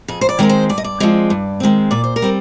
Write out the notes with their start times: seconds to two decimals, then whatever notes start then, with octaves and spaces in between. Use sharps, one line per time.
0.08 F2 G#4
0.21 C5
0.29 D5
0.39 D#3 G#3 C4 A#4
0.50 C5
0.69 G2 D5
0.78 D#5
0.84 D5
1.00 F3 G#3 C4
1.30 G2
1.60 D#3 G#3 C4
1.91 A#2 D5
2.04 C5
2.16 A#4
2.22 G3 C4